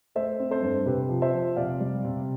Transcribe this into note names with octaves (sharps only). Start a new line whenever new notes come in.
A3 C5 E5
C4
A4 C5
G2
C3 G4 B4
F3
C5 E5
F3
C3 D5 F5
G3
C3